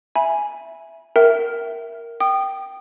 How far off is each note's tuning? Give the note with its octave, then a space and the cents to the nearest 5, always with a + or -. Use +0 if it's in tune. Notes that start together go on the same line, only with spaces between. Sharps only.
E5 +0 G#5 +0 B5 -30
A#4 +0 E5 +0 G5 -35
G5 -10 D#6 -30